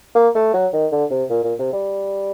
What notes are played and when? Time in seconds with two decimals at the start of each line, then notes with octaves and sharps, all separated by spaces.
0.15 A#3
0.35 A3
0.53 F#3
0.73 D#3
0.92 D3
1.10 C3
1.30 A#2
1.44 A#2
1.59 C3
1.73 G3